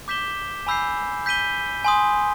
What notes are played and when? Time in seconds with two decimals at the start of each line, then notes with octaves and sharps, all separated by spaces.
0.08 D6 G6 B6 E7 G7
0.67 G#5 B5 E6 G6 C7
1.26 G6 B6 D#7 G7
1.84 G#5 C6 D#6